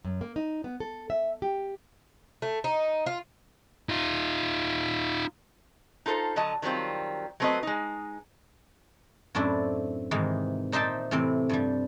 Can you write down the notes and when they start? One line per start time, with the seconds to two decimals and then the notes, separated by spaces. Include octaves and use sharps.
0.05 F#2
0.21 A#3
0.36 D#4
0.64 B3
0.80 A4
1.10 E5
1.42 G4
2.42 A3
2.64 D#4
3.06 F4
3.89 D#4 F4
6.06 D#4 F4 A4 B4 C5
6.36 D3 F#3 D#5 A5
6.62 D#3 F#3 G3 C4 F4
7.40 F#3 A3 C4 F#4 B4 D#5
7.63 G#3 D#4
9.35 F#2 A2 C4 D4 E4
10.11 G#2 C3 D#3 E3
10.72 A#2 D#4 C5 E5 G5 A5
11.11 A2 C3 E3 C4
11.49 G2 F3 G3